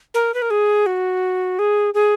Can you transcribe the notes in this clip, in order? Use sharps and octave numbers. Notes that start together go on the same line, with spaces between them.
A#4
B4
A#4
G#4
F#4
G#4
G#4